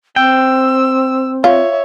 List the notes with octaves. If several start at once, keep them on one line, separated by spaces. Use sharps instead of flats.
C4 G5 E6
F4 C#5 E5